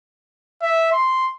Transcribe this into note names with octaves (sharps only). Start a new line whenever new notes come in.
E5
C6